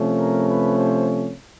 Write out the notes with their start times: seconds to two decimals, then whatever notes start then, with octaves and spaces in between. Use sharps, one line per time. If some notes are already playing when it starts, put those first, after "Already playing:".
Already playing: C3 F3 A3 C#4
0.19 A#4
0.47 B4
0.76 C5